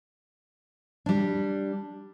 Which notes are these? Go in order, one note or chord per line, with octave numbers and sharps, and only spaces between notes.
G3 D4